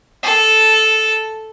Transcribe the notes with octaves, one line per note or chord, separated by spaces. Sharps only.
A4